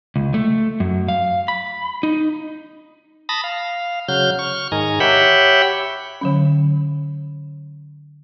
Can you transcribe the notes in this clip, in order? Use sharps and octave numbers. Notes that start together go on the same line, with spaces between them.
C#2
A3
F#2
F5
B5
D#4
A5 B5 D#6 A#6
F5
C#3 F#3 F6 G6
C#6 F6
G#2 D#3 G#5 A#5
G4 C#5 E5 F#5 G5 B5
D3 F#3 C#4